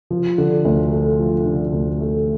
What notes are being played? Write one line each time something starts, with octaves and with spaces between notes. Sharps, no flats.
F3
D3
D2
A3
F3
D3
D2
A3